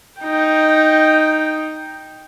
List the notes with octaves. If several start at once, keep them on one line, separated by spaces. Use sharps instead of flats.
D#4 G5